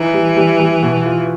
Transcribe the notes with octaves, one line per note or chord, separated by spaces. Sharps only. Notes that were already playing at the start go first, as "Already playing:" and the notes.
Already playing: E3 D#4
G3
G3
G3
B2
F4